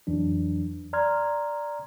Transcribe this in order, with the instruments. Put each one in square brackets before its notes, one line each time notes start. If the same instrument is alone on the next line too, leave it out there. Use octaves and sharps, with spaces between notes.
[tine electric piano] F2 E3 F#3 D4
D5 A#5 C6 F6 G#6